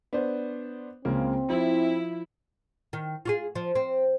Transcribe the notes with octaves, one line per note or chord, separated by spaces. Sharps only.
B3 D4 C5
C#2 C#3 A#3 C4
F3 E4
D#3
F4 F#4 G#4
F3
C4